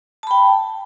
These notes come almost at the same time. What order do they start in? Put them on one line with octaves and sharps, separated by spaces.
A5 B5 G5